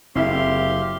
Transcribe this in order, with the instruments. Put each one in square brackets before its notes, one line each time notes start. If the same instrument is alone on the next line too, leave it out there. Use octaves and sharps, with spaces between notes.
[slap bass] F#1 [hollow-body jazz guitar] C4 E4 E5 [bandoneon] G4 F5 C6